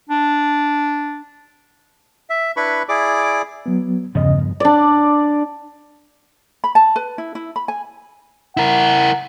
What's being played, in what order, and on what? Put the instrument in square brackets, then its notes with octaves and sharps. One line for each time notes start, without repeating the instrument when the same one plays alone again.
[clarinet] D4
[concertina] E5
D4 E4 B4 B5 C#6
E4 G#4 D5 D6
[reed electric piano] F#3 B3
[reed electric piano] E2 C#3 D#5 [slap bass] G2 F3 B3
[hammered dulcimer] D4 D5
[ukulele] B5
A5
B4
E4
E4
B5
G#5
[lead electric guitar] E4 A#4 [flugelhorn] F#5